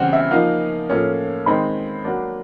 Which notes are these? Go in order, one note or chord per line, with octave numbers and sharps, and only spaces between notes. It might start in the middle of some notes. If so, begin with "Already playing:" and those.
Already playing: C#3 E3 G3 C4 F#5
E5
F3 A#3 D#4 F5
A2 F3 A#3 C#4
D#3 G#3 C4 D#4 B5
F#3 A#3 D4